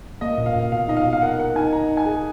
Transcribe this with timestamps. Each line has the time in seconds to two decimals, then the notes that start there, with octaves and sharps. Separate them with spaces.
0.21 A#3 D#5
0.38 A#2
0.46 F5
0.55 A#2
0.72 B2 F5
0.88 D#4 D#5
0.97 F5
1.05 B2
1.13 F5
1.22 A#4 F#5
1.39 A#4 F#5
1.56 D#4 G#5
1.73 D#4 A#5
1.89 D#4
1.97 G#5
2.06 G#4